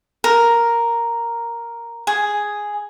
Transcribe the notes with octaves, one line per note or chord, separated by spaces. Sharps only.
A#4
G#4